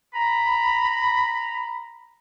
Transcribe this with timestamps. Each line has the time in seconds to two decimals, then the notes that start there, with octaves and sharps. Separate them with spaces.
0.14 A#5 B5